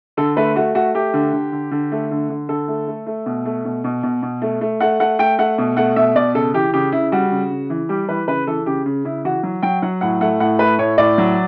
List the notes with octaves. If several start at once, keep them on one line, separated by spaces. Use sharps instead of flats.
D3 A4
A3 B4
A3 F#4
A3 F#4
A3 G4
D3
D3
D3
D3
A3
D3
D3
D3 A4
A3
A3
A3
B2
A3
B2
B2
B2
B2
A3
A3
A3 F#5
A3 F#5
A3 G5
A3 F#5
B2
A3 F#5
B2 E5
B2 D5
C#3 A4
E3 G4
C#3 G4
C#3 E4
G3 F#4
C#3
C#3
E3
G3 G4
E3 B4
C#3 B4
E3 A4
C#3 G4
C#3
C#3 E4
E3 F#4
F#3
F#3 G5
F#3 F#5
A2 F#5
A3 F#5
A2 F#5
A3 B4
A2 C#5
A2 D5
F#3